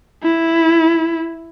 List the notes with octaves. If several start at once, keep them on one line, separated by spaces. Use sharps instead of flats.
E4